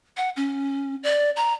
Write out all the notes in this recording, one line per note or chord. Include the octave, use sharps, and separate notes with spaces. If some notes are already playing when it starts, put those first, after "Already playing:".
F#5
C#4
D5
A#5